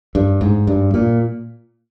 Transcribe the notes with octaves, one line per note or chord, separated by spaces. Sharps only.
G2
G#2
G2
A#2